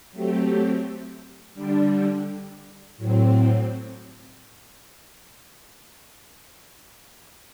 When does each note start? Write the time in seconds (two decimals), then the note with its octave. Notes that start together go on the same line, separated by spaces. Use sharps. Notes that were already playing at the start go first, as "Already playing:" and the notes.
0.12 F#3 A3 C4 G4
1.54 D3 G3 D4
2.97 A2 F#3 C4